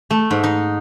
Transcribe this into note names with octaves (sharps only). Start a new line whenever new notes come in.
A3
G#2
D#4